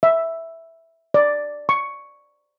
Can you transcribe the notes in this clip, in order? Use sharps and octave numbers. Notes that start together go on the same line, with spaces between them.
E5
D5
C#6